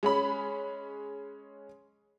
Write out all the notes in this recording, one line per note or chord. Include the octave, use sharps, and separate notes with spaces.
G#3 C#4 B5